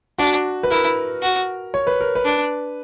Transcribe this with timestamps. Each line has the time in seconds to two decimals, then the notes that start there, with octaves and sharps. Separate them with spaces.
0.18 D4 F#4
0.63 B4
0.71 E4 A#4
1.22 F#4
1.74 C#5
1.87 B4
2.01 A#4
2.15 B4
2.25 D4